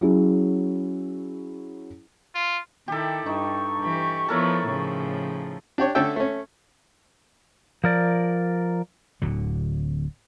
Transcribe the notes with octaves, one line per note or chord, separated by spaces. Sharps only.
F#3 C#4 E4 G#4
F4
D#3 E4 G4 A4
G2 D#4 C#6
E3 G4
F3 B3 E4 A4 A#4 C#5
A2 C#3 F3
D4 G4 C#5
D3 A3 C#4 A4 E5 G5
A3 C#4
F3 A#4 D5
D1 D3 F#3